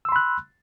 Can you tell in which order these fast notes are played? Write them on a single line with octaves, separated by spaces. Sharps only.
E6 C6 B5 F#6